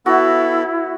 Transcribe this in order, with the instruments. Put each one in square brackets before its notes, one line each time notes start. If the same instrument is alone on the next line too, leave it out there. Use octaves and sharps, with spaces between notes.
[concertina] B3 A4 [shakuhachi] E4 [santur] F#4